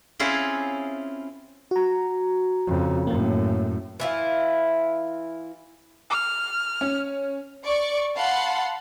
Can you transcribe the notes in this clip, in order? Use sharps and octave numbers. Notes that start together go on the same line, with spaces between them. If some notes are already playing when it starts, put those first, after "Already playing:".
C4 C#4 E4 F4 G#4
F#4 A#5
F2 C#3
F#2 A2 A#3
E3 E4 F4
F6
C#4
D5 C#6
F5 F#5 A5 B5 C6